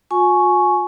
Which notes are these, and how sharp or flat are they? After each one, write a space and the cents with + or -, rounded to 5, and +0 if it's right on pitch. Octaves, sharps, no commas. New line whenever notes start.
F4 +45 G#5 +20 C#6 +0